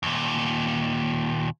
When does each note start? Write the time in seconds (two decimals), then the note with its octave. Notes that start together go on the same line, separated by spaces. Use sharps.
0.03 D#2 A#2